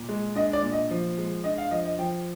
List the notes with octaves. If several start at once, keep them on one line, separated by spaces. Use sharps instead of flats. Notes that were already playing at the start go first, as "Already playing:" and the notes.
Already playing: A#2
G#3
D4 D#5
D5
A#2
D#5
F3
G#3
D4 D#5
F5
F3 D#5
D#5
F3 G5